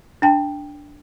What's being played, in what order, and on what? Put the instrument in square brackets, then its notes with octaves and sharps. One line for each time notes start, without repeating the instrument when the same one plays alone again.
[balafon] D4 G5 A5